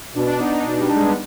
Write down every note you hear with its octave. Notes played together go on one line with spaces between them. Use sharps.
B2 D4
D4
B3 D#4
D#4
B2 D4
G3
D4
G#3
B3